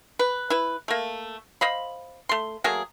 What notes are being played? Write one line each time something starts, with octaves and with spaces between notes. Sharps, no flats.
B4
E4 B4
A3 A#3
C5 D#5 F5 B5
A3 C6
F#3 A3 A#3 G#4